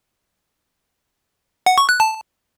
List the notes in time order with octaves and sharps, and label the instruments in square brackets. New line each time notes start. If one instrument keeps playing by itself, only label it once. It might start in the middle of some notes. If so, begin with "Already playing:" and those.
[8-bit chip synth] F#5
C#6
F#6
A5